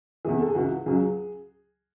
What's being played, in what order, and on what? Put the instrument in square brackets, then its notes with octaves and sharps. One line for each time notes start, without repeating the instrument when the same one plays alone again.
[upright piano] E2 C3 E3 G#4
A4
G#4
C#2 C#3 E3 F#4
C#2 C#3 F#3 G#4